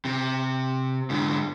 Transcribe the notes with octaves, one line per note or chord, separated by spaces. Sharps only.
C3
G#2 D3